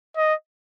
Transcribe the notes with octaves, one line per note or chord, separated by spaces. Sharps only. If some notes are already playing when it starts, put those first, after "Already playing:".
D#5